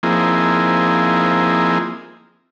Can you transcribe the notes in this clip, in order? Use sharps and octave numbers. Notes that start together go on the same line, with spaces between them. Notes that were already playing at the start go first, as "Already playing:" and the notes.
F3 A#3 C4 D#4 E4 G#4